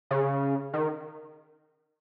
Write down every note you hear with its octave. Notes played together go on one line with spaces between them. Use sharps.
C#3
D#3